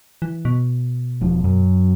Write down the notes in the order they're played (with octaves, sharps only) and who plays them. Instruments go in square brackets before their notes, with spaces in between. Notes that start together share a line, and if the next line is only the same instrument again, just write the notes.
[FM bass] E3
B2
[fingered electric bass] E1 F3
F#2 F#3